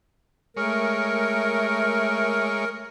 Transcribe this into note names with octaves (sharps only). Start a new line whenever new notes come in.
G#3 A3 A#4 C#5